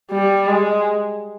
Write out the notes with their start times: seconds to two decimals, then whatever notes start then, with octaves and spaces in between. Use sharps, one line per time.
0.11 G3
0.48 G#3